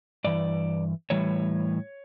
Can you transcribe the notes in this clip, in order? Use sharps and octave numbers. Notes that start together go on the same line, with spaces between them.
G2 E3 D5
A2 E3 G3 C#5